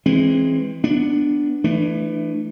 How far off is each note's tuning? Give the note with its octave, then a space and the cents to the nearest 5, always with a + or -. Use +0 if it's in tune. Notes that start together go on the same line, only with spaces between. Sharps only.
E3 +0 G#3 +0 C4 +25
B3 +0 D4 +0
E3 +10 A3 +0 D4 +30